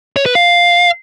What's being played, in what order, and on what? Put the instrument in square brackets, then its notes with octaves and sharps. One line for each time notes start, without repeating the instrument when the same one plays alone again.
[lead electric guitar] C#5
B4
F5